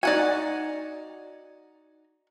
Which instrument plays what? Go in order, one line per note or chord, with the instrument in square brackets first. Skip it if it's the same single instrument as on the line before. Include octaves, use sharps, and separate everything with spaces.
[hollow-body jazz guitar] D#4 F#4 [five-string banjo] D5 F#5 G#5